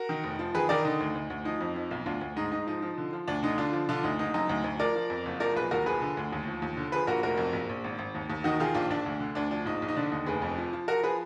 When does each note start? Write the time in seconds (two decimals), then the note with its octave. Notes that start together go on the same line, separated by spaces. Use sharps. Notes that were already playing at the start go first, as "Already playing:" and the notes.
Already playing: F#4 A#4
0.09 D#3
0.24 F1
0.39 F3
0.55 D#3 G#4 B4
0.69 D#3 A#4 D5
0.85 D3 D#4
1.01 D2
1.15 D2
1.30 D2
1.45 F3 D#4
1.61 F2
1.76 F3
1.91 B1
2.06 D2 D4 F4
2.21 D2
2.36 G#2 D#4
2.51 G#2 D#4
2.67 F3 D#4
2.82 F3
2.98 D3
3.13 F3
3.28 D2 D4
3.43 D3 D#4
3.58 D3 D4 F4
3.73 F3
3.89 D3 D4 F4
4.03 D2 D#4
4.19 F#1 D#4
4.34 F#2 D#4
4.49 D2
4.64 D2
4.79 F3 A#4 D5
4.96 F3
5.10 F2
5.26 F#1
5.40 F3 A#4 D5
5.56 B1 G#4 B4
5.71 D#2 F#4 A#4
5.86 F3 G#4 B4
6.02 D3
6.17 D2
6.32 D#2
6.47 F3
6.62 D#2
6.77 D3
6.92 F3 G#4 B4
7.07 A#1 F#4 A#4
7.23 F1 F#4 A#4
7.38 F2
7.53 A#1
7.69 A#1
7.84 G#1
7.99 G#1
8.15 D#2
8.30 D#2
8.44 D#3 D#4 F#4
8.60 D#3 F4 G#4
8.74 A#1 D4 F4
8.90 A#1 D4
9.06 D2
9.20 D3
9.35 D2 D4
9.51 F3 D4
9.66 A#1 D#4
9.82 A#1
9.88 D#4
9.96 D3 D4
10.12 D#2 D#4
10.26 F1 G#4 B4
10.42 F2
10.58 F3
10.73 F3
10.88 F3 F#4 A#4
11.03 F3 G#4 B4